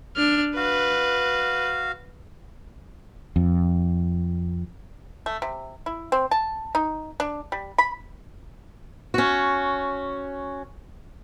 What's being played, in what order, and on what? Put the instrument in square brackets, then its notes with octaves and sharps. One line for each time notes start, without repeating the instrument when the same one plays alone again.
[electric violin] D4 F6
[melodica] F#4 F5 [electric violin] B4
[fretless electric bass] F2
[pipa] A3
C3
E4
C4
A5
D#4
D4
G3
B5
[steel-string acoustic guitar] C#4 F#4